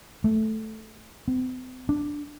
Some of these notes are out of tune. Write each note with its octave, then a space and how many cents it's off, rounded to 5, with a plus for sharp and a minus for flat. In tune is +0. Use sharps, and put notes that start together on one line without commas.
A3 -5
C4 -45
D4 +0